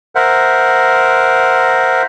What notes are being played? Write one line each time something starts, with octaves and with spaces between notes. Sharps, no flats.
A#4 C5 E5 F#5